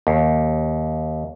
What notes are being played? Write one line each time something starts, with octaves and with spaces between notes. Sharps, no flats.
D#2